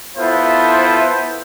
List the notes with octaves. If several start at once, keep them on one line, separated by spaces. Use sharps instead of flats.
B3 E4 F4 A4 C5